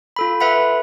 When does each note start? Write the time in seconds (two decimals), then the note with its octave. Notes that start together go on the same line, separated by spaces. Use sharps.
0.16 F4 A4 B5
0.40 A4 B4 E5 F#5 B5